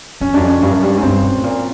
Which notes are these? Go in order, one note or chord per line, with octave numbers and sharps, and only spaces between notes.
F2 C#4
F#2 D4
F2
C#4
G2
F#2
G2
G#2
G2 C4
A#2
A2
A#2